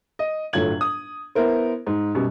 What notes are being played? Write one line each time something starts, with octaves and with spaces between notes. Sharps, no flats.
D#5
G1 A2 F#3 F4 G#6 F#7
D#6
B3 E4 A#4 C5
G#2
F#2 B2 G3